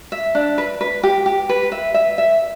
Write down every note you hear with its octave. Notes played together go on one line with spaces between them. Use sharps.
E5
D4
B4
B4
G4
G4
B4
E5
E5
E5